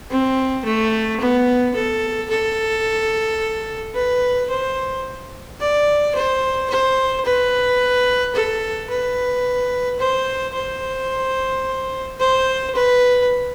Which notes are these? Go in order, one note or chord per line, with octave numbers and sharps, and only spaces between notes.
C4
A3
B3
A4
A4
B4
C5
D5
C5
C5
B4
A4
B4
C5
C5
C5
B4